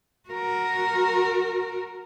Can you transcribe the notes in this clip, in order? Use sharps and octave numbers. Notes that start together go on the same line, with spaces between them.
F#4 A#4